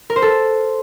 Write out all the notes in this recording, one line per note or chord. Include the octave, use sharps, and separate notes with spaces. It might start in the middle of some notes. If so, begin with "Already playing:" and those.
A#4
C5
A4